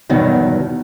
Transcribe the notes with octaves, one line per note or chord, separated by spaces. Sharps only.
E2 G2 B2 D#3 F#3